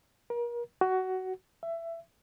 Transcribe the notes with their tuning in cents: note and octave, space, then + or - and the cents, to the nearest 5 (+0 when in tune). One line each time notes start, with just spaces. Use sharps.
A#4 +35
F#4 +15
E5 +20